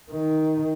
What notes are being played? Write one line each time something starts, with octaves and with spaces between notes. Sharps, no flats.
D#3